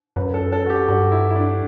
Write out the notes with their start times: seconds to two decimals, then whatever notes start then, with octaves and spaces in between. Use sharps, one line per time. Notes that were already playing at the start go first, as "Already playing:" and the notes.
0.16 F#2 B4
0.34 A4
0.52 A4
0.66 F#4
0.70 G4
0.88 G2 F#4
1.12 E4
1.31 E4
1.36 D4